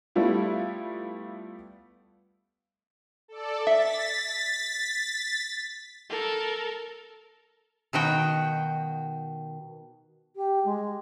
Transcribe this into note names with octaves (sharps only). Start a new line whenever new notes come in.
G3 A3 B3 E4 F4
A4 D5
E5 A6 B6
A4 A#4
B2 D#3 F#4 G5
G4
G#3